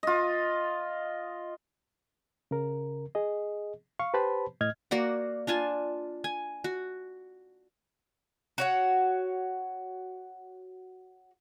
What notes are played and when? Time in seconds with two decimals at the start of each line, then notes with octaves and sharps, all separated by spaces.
0.03 F4 D#5
2.51 C#3 A#4
3.15 G#4 D#5
3.99 F5 C#6
4.14 G4 B4 C5 A5 B5
4.61 A2 D#5 F6 G#6
4.91 A#3 F#4 D5 F#5
5.47 D4 F4 G#5 A5
6.24 G#5
6.64 F#4
8.58 F#4 C#5 F#5